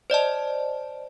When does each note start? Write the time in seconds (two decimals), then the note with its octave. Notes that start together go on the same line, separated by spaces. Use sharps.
0.10 C5 D5 D#5 A5